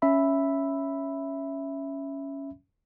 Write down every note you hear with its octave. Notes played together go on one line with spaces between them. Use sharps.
C#4 E5 B5